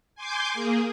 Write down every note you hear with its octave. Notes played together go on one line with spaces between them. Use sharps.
G#5 C6 D6 G6
A#3 G#4